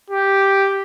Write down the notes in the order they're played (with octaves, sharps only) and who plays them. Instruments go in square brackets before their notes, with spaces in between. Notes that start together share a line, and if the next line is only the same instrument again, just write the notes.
[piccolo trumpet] G4